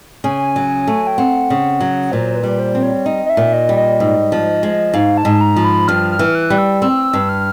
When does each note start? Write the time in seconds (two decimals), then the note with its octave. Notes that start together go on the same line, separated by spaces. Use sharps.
0.24 C#3 G#5
0.56 F#3
0.87 A3
1.07 G5
1.18 C4 F#5
1.50 C#3
1.81 F#3
2.12 A#2 C5
2.36 B4
2.43 G3
2.60 C5
2.75 C4
2.83 C#5
3.06 D#4 D#5
3.26 D#5
3.30 E5
3.37 A#2
3.53 D#5
3.69 G3
3.77 D#5
4.00 G#2
4.32 F3
4.63 G#3
4.94 G#2 F5
5.17 A5
5.25 G#2
5.41 A#5
5.56 F3
5.64 B5
5.88 G2 F6
6.12 F6
6.19 E3
6.35 F#6
6.50 G3
6.58 E6
6.82 C4 E6
7.13 G2
7.29 F6